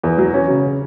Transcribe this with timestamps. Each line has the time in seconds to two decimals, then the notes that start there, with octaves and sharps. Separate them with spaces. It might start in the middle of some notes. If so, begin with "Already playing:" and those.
0.03 E2
0.18 F#3
0.34 C#4
0.50 C#3